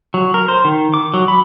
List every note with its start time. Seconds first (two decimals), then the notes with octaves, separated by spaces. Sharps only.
0.14 F#3
0.34 A#4
0.48 C5
0.64 D#3
0.94 D6
1.14 F#3
1.28 B5